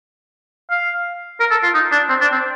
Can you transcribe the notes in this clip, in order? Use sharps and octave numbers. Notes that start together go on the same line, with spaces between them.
F5
A#4
A4
F4
D#4
D4
C4
D4
C4